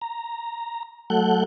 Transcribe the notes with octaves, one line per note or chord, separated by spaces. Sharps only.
A#5
F#3 A3 A4 F#5 F#6 G6